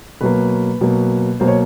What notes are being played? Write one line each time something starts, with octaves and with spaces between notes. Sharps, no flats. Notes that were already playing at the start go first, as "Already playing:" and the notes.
B2 F#3 A#3 B4
B2 F#3 A#3
B2 F#3 A#3 C5
C#5